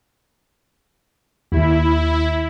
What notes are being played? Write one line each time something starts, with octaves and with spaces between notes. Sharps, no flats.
D#2 E4